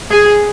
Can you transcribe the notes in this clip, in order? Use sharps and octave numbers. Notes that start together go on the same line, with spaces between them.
G#4